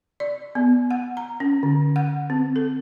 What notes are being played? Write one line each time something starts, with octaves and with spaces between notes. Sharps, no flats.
D5
B3
F#5
A#5
C#4
D3
F#5
C4
A4